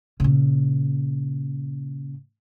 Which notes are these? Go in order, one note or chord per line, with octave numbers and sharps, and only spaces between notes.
A#2 C#3